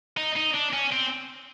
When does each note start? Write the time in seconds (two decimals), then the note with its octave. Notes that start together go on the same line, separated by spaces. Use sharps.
0.17 D#4
0.36 D#4
0.54 D4
0.73 C#4
0.92 C4